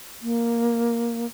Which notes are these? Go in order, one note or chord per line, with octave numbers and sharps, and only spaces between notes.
A#3